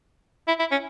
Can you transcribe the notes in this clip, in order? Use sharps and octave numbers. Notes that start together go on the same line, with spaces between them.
E4
E4
C#4